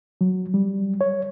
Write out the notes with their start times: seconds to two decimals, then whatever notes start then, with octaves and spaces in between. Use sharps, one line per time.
0.21 F#3
0.54 G3
1.01 C#5